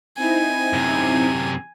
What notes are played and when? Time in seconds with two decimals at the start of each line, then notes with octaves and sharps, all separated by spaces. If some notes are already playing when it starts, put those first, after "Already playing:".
0.18 C4 D#4 E4 G#5
0.73 F#2 C3